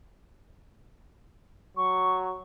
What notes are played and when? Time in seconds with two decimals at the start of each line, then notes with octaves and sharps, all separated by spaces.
1.77 F#3 C#6